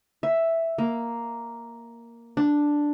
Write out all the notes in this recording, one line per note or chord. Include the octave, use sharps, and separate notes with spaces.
E5
A#3
D4